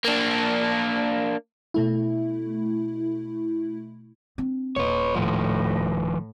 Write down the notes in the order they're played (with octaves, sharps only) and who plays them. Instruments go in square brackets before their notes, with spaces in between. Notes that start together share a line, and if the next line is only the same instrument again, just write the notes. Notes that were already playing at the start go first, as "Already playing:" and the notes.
[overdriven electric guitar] A#3 D4
[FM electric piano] B2 A3 E4
[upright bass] C4 D4
[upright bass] D#1 [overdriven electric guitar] B4 C#5
[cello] A2 [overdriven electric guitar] D#3 F3